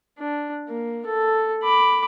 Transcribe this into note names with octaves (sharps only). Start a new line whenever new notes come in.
D4
A#3
A4
B5 D6